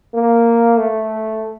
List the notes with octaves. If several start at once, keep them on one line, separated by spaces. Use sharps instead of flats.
A#3
A3